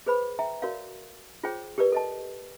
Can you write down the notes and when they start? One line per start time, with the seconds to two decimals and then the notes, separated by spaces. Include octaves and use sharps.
0.06 G#4 B4 C5 B5
0.39 E5 G5 A#5
0.62 F#4 A#4 C#5 D5 F5
1.43 F4 G#4 C5 C#5 G5
1.78 G4 A#4 B4 D5
1.92 A4 D#5 A5